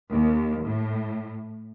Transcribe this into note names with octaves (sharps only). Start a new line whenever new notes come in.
D#2
A2